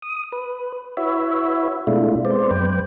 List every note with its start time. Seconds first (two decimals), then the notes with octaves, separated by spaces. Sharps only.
0.02 D#6
0.32 B4
0.97 E4 F#4 B4 C#5 E5
1.87 B2 G#3 A3 D4 E4 F4
2.25 G#3 B3 C4 C5 D5
2.51 F#2 B4 G5